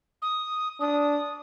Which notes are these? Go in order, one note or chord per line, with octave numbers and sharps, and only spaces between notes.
D#6
D4 D#6